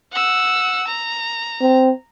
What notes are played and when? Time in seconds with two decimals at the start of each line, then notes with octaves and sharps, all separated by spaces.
0.12 F#5 E6
0.87 A#5
1.61 C4